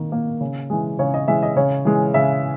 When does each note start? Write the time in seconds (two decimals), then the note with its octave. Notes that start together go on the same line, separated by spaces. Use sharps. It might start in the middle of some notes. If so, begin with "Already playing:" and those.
Already playing: D#3 A#3
0.12 A#3
0.41 C#3
0.70 E3 G#3
0.99 C#3 C#5
1.14 D#5
1.28 E3 G#3 E5
1.43 D#5
1.56 C#3 C#5
1.85 E3 G#3
2.14 C#3 E5